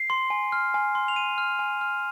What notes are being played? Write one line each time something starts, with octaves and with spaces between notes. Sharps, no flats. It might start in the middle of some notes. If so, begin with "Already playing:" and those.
Already playing: C7
C6
G#5
F6
G#5
C6
F7
G#5 D#7
F6
G#5
F6